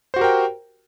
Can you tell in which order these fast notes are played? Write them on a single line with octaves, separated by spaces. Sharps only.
C5 F#4 G4 A#4 G5